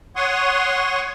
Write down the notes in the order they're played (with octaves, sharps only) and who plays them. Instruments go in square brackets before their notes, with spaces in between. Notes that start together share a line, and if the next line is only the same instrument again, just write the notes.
[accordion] C#5 F#5 C6 C#6 D#6